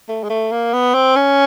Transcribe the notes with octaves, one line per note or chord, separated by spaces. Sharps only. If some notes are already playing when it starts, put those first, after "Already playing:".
A3
G#3
A3
A#3
B3
C4
C#4